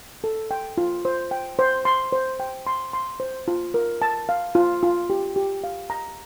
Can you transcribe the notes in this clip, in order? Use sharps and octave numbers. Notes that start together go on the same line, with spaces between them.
A4
G5
F4
C5
G5
C5
C6
C5
G5
C6
C6
C5
F4
A#4
A5
F5
F4
F4
G4
G4
F5
A#5